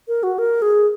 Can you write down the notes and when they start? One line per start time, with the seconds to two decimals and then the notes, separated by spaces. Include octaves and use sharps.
0.08 A#4
0.23 F#4
0.39 A#4
0.62 G#4